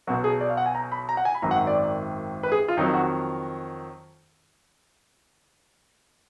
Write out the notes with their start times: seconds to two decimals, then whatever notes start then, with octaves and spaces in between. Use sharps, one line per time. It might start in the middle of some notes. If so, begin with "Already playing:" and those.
0.07 B1 B2 F#3 F#4
0.24 G#4
0.40 D5
0.49 F5
0.57 F#5
0.66 G#5
0.75 A#5
0.92 B5
1.09 A#5
1.17 F#5
1.25 G#5
1.34 B5
1.42 G#1 F#2 D#3 F#3 A#5
1.51 F#5
1.67 D5
2.43 B4
2.52 G#4
2.68 F4
2.77 F2 D#3 F#3 D#4
2.94 F#4